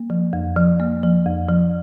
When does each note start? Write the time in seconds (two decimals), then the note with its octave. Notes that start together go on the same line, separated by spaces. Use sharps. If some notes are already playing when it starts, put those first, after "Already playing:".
Already playing: A#3
0.10 F3
0.33 F2
0.56 F3
0.80 A#3
1.03 F3
1.26 F2
1.49 F3